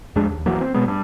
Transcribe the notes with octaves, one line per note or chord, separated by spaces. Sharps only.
F2 G#3 D4
D#2
E3 F#3 A#3
C4
B2 F#3 G#3 B3
G2